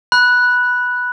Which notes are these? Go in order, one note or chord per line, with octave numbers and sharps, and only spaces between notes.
B5 F#6